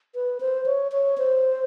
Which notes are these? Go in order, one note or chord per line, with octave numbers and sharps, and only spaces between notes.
B4
C5
C#5
C#5
C5